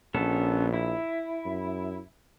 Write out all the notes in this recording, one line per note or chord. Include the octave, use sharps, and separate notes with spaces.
A#1 B3 C#4 A4
E4
F#2